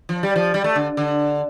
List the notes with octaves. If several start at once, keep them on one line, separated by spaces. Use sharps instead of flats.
F3
G3
F3
G3
A3
D3
D3